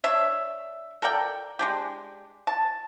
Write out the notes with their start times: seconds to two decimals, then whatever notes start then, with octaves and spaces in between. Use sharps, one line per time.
0.04 D4 C#5 E5
1.02 A4 A#4 D5 G5
1.59 G#3 D4 G4
2.47 A5